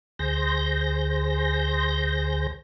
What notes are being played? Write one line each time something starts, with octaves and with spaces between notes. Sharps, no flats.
D2 G#4 C5 G6 A#6